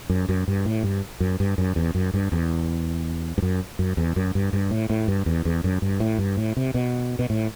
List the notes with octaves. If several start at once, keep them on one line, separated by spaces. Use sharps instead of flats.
F#2
F#2
G2
A2
G2
F#2
G2
F#2
E2
F#2
G2
E2
G2
F#2
F#2
E2
F#2
G2
G2
A2
A2
G2
E2
E2
F#2
G2
A2
G2
A2
C3
B2
B2
A2